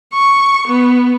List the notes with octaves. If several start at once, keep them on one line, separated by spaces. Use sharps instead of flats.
C#6
B3